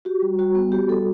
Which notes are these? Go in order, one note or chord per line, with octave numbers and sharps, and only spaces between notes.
F#4 G4
G3
G3 F#4
B3
F#4 G4
G3 A4